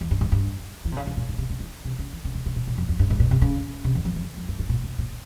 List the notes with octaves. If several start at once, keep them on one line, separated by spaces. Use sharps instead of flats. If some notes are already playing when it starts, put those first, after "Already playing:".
E2
G2
G#2
G2
E3
C3
C#3
C#3
A#2
G#2
C3
C#3
E3
C3
C#3
E3
C#3
C3
C3
A#2
A#2
F2
F2
G2
G#2
A#2
C3
C#3
C3
E2
F2
F2
F2
G2
G#2
A#2
C3
A#2